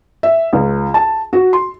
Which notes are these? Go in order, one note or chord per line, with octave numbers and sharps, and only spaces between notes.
E5
C#2
A5
F#4
C6